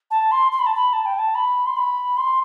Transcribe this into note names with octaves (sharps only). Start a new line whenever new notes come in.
A5
C6
C6
B5
A5
B5
A5
G5
A5
B5
C6
B5
C6